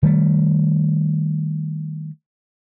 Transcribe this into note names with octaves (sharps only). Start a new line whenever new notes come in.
D#3 G3 A3